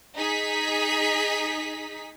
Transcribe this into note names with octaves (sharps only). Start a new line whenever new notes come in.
D#4 G#4 B6